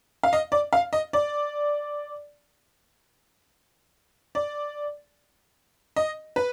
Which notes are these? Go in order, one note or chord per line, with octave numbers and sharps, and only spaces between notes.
F5
D#5
D5
F5
D#5
D5
D5
D#5
B4